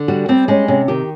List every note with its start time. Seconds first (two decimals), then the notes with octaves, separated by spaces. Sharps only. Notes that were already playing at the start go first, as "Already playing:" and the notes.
Already playing: D3
0.08 G3 F#4
0.29 G3 C4
0.48 G#3 C#4
0.68 C3 C#4
0.88 D#3 G4